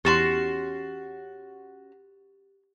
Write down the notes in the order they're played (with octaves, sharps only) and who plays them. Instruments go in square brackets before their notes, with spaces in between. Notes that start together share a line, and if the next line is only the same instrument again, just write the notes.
[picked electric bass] E2 [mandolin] C#4 F#4 C6 [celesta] G4 A6 E7